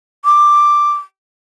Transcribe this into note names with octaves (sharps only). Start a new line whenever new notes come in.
D6